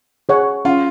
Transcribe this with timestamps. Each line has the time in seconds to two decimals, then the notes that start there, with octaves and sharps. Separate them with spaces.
0.29 G#4 C#5 F#5
0.65 C#4 F4